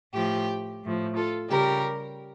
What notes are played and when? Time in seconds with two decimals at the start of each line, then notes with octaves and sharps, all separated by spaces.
0.14 A2 F3 G4
0.83 A2 F3
1.16 F4 A4
1.50 C#3 G3 G4 A#4